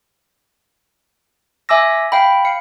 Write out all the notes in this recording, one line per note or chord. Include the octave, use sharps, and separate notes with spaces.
E5 G#5 D6 E6 A#6
F5 G5 B5
F5 C#7